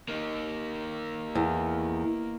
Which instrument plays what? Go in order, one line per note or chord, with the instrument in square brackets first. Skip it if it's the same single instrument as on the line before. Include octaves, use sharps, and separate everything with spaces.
[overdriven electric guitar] A#3 D#4
[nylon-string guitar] E2